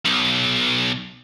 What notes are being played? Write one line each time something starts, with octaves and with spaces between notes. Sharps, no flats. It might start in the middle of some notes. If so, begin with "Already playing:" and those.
B1